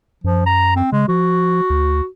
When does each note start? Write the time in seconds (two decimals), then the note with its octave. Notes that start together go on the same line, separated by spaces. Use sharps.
0.24 F#2 F3
0.46 A#5
0.76 C4
0.92 C#3 G#3
1.08 F3 F#4
1.70 D2